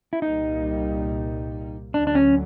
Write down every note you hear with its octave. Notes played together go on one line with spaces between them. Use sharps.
E4
C2 A#2 G3 A#3 D#4
D2 D3 F#3 D4
D4
C#4